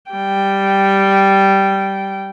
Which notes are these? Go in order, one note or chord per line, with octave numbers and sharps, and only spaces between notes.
G3 G5